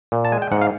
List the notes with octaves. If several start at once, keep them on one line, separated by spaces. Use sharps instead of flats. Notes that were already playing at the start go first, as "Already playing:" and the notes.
A#2
A5
G#3 G#5
G5
G#2 F#5
F5